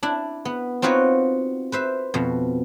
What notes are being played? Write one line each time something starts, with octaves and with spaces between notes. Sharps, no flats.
D4 E4
B3
C4 D#4 F4 F#4 B4 C#5
B4 C5 E5
F2 B2